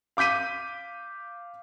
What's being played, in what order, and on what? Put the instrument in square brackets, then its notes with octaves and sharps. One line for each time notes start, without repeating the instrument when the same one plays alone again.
[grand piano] F5 D6 G6 B6 D#7